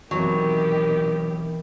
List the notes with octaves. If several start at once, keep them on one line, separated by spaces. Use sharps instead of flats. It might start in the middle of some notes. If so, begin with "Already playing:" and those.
B2 D#3 E3 F#3 B3 C4 G4